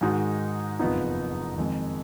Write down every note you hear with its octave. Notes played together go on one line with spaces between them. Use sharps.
G#2 D#3 G#3 D#4 F#4
F#1 F2 F3 B3 D#4
F2 D#3 G#3